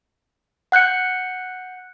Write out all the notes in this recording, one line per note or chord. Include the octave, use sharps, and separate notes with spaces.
F#5 F#6 G6 C#7